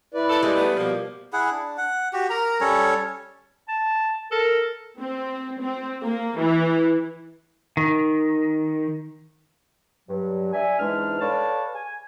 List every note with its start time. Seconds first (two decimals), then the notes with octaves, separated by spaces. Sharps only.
0.14 E4 B4 D5
0.30 A4
0.43 E3 G3 G#3
0.56 A3 B3
0.77 B2 F3 A#3
1.33 E4 G#4 F#5
1.51 D4
1.77 F#5
2.13 F#4 G4
2.30 A#4 A#5
2.61 G3 C#4 A4 C#5
3.68 A5
4.32 A4 A#4
4.99 C4
5.60 C4
6.04 A#3
6.39 E3
7.77 D#3
10.09 G2 F#3
10.53 D5 E5 G#5
10.79 E2 G#2 E3 G#3 D4 F6
11.20 A4 B4 C#5 D5 F5 A5
11.74 G#5